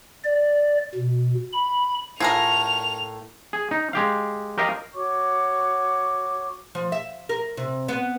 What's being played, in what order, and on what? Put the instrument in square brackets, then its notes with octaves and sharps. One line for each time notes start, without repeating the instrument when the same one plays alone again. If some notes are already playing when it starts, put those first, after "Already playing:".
[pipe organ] D5
B2
B5
[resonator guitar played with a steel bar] A2 [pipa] F4 G#4 A#4 [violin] F7
[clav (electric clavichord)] G#4
D#4
G#3 G4 F5
G4 A#4 D#5 F5
[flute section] F#4 C#5 C#6 D6
[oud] F3
E5
A#4
C3
B3